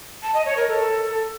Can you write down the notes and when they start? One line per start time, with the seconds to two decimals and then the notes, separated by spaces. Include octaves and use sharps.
0.23 A5
0.34 D#5
0.45 C#5
0.57 A#4
0.68 A4